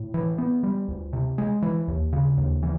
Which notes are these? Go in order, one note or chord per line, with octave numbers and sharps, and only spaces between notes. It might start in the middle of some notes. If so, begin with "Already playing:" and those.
Already playing: A2
E3
B3
G3
D2
C3
G#3
E3
D#2
C#3
D#2
E3